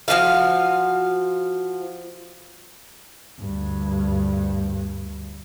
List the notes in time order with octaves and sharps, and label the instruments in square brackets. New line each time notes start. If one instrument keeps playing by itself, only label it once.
[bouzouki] F3 B3 F#4 F5
[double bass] D2 G2